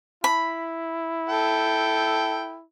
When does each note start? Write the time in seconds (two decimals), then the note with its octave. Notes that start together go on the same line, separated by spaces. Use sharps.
0.24 E4 B5
1.29 A4 G5